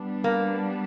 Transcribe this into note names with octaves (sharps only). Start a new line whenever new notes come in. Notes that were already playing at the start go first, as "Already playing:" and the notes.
Already playing: G3 B3 D4
A#3